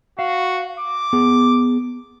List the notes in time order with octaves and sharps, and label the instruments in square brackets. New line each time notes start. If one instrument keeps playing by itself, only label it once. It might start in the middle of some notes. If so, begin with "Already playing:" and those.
[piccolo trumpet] F#4 [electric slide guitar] F5
[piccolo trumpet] D6
[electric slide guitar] B3 G#4